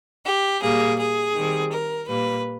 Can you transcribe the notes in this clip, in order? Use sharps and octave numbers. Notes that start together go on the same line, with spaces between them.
G4
A#2 G3 A#3 G#4
G#4
D#3 G3 C4
A#4
A#2 G3 A#3 B4